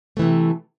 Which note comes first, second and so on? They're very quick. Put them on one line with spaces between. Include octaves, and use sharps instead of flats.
A3 E3 C3